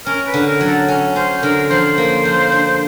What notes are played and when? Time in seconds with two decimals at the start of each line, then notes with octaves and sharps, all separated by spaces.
0.06 C#4 A#4
0.28 B4
0.34 D3
0.47 A#4
0.61 F#3
0.67 A4
0.88 C#4
1.16 C#4 C5
1.43 D3 A#4
1.70 F3 C5
1.98 A#3
2.25 F3
2.52 D4